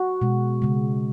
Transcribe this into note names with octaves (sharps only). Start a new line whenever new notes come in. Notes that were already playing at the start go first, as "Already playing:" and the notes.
Already playing: F#4
B2 G#3
C#3 G#3